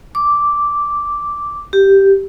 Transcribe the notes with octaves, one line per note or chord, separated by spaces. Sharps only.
D6
G4